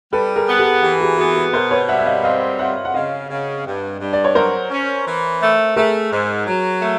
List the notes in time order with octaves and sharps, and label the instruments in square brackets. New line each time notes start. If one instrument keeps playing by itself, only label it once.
[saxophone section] G3 [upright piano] A4 B4
[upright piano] G#4 A#4
[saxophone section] B3
[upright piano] G4 A4
[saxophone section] E3 [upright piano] G4
[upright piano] F#4 G#4
[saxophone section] B3 [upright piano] F#4 G#4
[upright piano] F#4 G#4
[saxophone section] B2 [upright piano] A#4 C5
[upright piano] B4 C#5
[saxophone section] G3 [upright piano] E5 F#5
[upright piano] E5
D#5 F5
[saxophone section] C4 [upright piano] D#5 F5
[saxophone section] F4 [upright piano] E5 F#5
[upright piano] F#5
[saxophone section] C#3 [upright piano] D#5 F5
[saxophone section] C#3
G2
G2
[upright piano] D5
C#5
[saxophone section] F#3 [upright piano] A#4 C5
[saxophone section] C#4
E3
A3
[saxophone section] A3 [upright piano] G#4 A#4
[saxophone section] G#2
F#3
A3